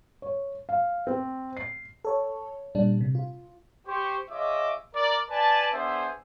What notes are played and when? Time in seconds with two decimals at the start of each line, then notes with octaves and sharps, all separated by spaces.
0.22 C#5
0.69 F5
1.07 C4
1.57 C7
2.05 A4 C#5
2.75 A#2 G3 D4
3.01 C3
3.15 F4
3.87 G4 C5 C#6
4.30 F4 G#4 C#5 D#5 E5 D6
4.95 A#4 D5
5.30 B4 D5 G#5 A5
5.73 B3 D4 G#4 C5 E5